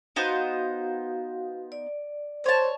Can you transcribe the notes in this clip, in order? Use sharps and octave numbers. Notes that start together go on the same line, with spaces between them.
B3 D#4 F#4 C5 F5
D5
C5 C#5 A5